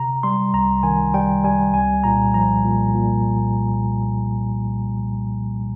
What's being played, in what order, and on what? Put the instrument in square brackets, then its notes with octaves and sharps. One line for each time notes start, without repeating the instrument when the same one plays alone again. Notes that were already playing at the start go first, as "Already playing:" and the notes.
Already playing: [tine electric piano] C3 A#5
G3 C6
C2 A#5
D#3 G#5
G3 G5
G3 G#5
C2 G#5
A#2 A#5
F3 A#5
A#2
A#2